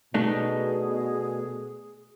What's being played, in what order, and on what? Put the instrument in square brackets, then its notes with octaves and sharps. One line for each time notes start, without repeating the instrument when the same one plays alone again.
[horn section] B2 [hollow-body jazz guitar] A3 D4 D#4 [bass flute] G#4